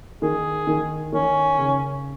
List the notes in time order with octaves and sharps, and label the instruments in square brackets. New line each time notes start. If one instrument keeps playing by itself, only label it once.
[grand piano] D#3 [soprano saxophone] G#4
[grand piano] D#3
[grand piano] D#3 [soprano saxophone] C#4
[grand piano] C#3